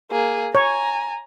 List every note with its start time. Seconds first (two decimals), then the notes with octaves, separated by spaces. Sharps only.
0.11 A#3 G#4
0.55 C#5 G#5 A#5